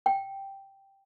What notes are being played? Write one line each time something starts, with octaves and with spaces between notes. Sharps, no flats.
G5